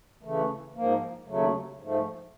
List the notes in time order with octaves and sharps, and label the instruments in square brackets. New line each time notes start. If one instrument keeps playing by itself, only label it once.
[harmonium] C#3 E3 A3
G#2 F3 A#3
D#2 C#3 F#3 A3
G#2 F3 A3